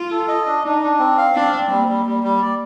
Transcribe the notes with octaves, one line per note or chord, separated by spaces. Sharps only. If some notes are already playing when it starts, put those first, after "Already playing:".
Already playing: F4
A4
D#5
D4
D4 D#4
D4
C4
F5
C4 D4
C4
G3 A#3
G3
G3
G3
D5